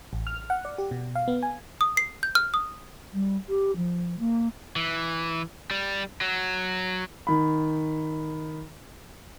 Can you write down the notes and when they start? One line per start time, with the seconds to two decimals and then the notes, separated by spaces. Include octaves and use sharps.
0.13 A1
0.27 F6
0.50 F#5
0.65 D5
0.78 G4
0.91 B2
1.15 F5
1.28 B3
1.43 G#5
1.81 D#6
1.97 C7
2.23 G6
2.35 F6
2.54 D#6
3.13 G3
3.48 G4
3.76 F3
4.19 A#3
4.76 E3
5.71 G3
6.21 F#3
7.27 D#3 B5